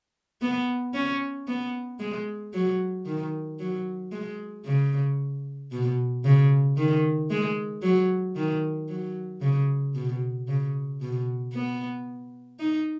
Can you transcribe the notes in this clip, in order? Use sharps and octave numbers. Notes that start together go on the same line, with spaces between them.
B3
C#4
B3
G#3
F#3
D#3
F#3
G#3
C#3
B2
C#3
D#3
G#3
F#3
D#3
F#3
C#3
B2
C#3
B2
B3
D#4